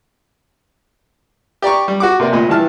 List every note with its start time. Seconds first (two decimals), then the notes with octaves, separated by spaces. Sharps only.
1.62 G4 D5 A#5 C#6
1.88 G3
2.00 F#4 F#5 D6
2.20 C3 A#3 D5
2.32 D2 A#2 D#5 B5
2.49 G2 E3 E5 A5 F6